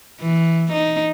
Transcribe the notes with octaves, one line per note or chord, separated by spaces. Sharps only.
E3
D#4